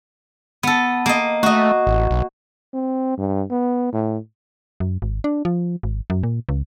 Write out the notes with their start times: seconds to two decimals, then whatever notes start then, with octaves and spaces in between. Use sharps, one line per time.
0.63 B3 A4
1.06 A#3 D#5
1.43 A3 F#4 D#5
1.87 A1
2.11 B1
2.74 C4
3.17 G2
3.51 B3
3.93 A2
4.80 F#2
5.02 G#1
5.24 D4
5.45 F3
5.83 G#1
6.10 F#2
6.23 A#2
6.49 C#2